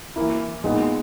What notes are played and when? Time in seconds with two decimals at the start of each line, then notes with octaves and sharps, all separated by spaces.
0.16 E3 A#3 E4
0.64 A#2 G#3 B3 D#4